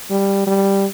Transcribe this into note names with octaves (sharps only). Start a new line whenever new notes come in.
G3
G3